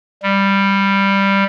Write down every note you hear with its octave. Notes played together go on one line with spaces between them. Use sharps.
G3